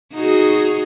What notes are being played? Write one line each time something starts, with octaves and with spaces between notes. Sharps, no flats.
D#4 F#4 G#4